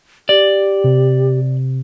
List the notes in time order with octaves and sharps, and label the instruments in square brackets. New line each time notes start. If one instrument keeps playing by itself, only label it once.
[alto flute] G4 [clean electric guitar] D5
[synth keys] C3